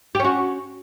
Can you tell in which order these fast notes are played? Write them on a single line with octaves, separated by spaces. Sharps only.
G4 C#4 F#4